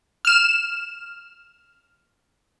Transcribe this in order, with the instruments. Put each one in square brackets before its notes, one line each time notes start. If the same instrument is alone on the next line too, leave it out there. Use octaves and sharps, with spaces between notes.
[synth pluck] F6 E7